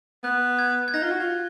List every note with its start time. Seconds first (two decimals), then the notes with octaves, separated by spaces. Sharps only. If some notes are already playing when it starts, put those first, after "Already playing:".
0.24 B3 F#6
0.59 G#6
0.88 G#6
0.94 D#4 A#6
1.02 F4
1.11 F#4
1.20 F4